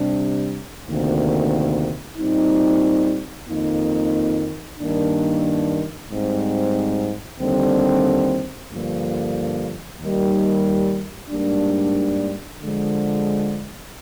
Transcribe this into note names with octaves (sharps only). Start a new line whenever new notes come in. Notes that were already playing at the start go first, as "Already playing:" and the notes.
Already playing: C3 G3 D4
D2 C3 D#3 A#3
A#2 G3 C4 D#4
F2 D#3 A#3 D#4
G2 D#3 A#3 D4
G#2 G3 C4
D#2 D3 G3 C4
G2 D3 F3 A#3
D#2 D#3 G3
G#2 G3 A#3 D4
D3 F3 G#3